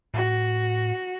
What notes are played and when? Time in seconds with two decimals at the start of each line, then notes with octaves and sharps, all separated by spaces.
0.14 A2 F#4